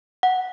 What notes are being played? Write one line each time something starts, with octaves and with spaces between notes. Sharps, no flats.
F#5